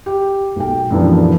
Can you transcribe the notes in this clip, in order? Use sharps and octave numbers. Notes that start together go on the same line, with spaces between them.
G4
B1 G5
F#2 A#2 D3 E3 F3